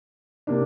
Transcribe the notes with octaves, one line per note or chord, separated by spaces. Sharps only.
C3 A#3 D4